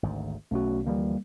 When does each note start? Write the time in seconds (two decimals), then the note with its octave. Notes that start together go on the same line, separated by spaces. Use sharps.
0.03 G#1 D2 G#2
0.51 B1 A3 C#4 F#4
0.87 D2 E3 F3 G3 A#3